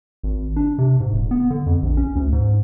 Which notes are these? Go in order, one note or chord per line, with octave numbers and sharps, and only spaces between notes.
G#1
D4
C3
G#2
D#1
B3
D3
F2
A#1
C#4
D2
G#2